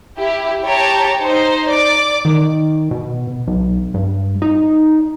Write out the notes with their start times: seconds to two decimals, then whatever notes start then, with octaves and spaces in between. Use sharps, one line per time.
0.18 E4 G4
0.64 G4 C#5 A5 A#5
1.22 D#4 C5
1.69 D5 D6
2.25 D#3
2.91 B2
3.47 B1
3.94 G2
4.42 D#4